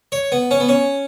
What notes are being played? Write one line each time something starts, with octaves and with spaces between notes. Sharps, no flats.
C#5
B3
C#4
B3
C#4